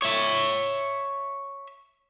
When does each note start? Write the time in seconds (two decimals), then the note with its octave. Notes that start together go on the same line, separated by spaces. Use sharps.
0.02 C#5 E5